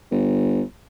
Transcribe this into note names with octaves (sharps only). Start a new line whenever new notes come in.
G1